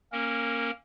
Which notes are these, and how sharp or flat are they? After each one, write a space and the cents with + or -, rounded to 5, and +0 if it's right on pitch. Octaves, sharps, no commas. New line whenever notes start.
A#3 +0 C#4 -25 A#4 -10